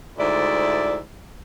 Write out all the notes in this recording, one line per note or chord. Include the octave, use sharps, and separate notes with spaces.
D2 G#2 E4 D5